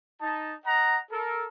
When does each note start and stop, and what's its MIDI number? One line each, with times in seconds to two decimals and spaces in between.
0.20 0.53 63
0.20 0.53 81
0.66 0.97 75
0.66 0.97 78
0.66 0.97 82
1.11 1.45 69
1.11 1.45 70